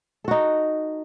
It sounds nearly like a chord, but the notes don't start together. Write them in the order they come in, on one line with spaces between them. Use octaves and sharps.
A4 F#4 D#4